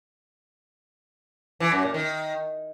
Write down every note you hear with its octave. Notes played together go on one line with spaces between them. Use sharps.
E3
F#2
A#2
D#3